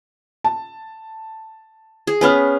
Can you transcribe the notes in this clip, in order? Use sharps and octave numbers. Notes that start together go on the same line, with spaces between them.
A5
G#4
B3 C#4 B4 G#5 B5 F6